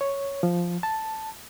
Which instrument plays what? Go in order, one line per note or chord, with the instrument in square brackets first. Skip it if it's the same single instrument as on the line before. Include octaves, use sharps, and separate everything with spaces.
[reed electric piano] C#5
F3
A5